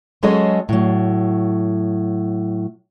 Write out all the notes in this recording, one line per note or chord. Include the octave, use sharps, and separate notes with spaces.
F#3 G#3 C#4 G#4 A4 D#5
A2 F#3